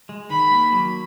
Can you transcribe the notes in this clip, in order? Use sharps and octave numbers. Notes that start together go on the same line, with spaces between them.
G#3
D#3 B5
A#3
F#3